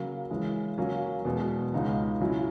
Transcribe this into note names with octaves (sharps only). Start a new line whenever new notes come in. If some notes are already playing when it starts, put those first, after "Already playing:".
Already playing: C#3 F#3 A#3
C#3 E3 G#3
C#3 F#3 A#3 C#4
E2 B2 G#3 B3
C#2 C#3 G#3 D#4 F#4
C#3 F#3 C#4 E4